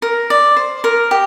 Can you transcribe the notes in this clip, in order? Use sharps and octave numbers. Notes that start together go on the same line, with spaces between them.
A#4
D5
C5
A#4
G4